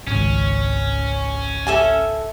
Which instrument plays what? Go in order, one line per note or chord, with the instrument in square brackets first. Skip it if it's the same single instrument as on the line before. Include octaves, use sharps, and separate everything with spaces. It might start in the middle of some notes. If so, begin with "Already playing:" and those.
[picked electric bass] G#1 C#2 [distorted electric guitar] C#4
[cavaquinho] A4 E5 G#5